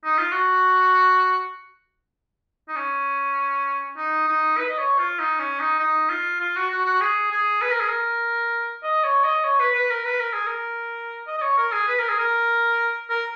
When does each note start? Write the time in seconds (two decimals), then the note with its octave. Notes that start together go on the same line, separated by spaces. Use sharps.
0.04 D#4
0.18 F4
0.32 F#4
2.68 D#4
2.76 C#4
3.97 D#4
4.27 D#4
4.58 B4
4.69 D#5
4.78 C#5
4.99 F4
5.19 D#4
5.39 C#4
5.59 D#4
5.80 D#4
6.09 F4
6.40 F4
6.56 F#4
6.70 F#4
6.86 F#4
7.01 G#4
7.32 G#4
7.62 B4
7.71 A#4
7.80 G#4
7.89 A#4
8.84 D#5
9.04 C#5
9.24 D#5
9.44 C#5
9.60 B4
9.75 B4
9.90 A#4
10.05 B4
10.20 A#4
10.33 G#4
10.47 A#4
11.27 D#5
11.38 D#5
11.42 C#5
11.58 A#4
11.72 G#4
11.88 B4
11.99 A#4
12.09 G#4
12.19 A#4
13.10 A#4